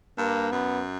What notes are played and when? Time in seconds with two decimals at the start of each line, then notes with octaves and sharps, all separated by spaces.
0.18 G2 A#3
0.52 F#2 B3